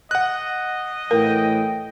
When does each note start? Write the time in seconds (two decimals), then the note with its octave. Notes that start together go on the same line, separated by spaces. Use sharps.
0.11 D#5 F#5 F#6
1.11 A2 E3 A#4 G5